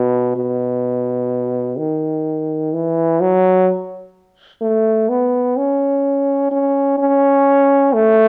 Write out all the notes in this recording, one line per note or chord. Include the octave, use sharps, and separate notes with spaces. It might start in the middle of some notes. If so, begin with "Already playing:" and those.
Already playing: B2
B2
D#3
E3
F#3
A3
B3
C#4
C#4
C#4
A3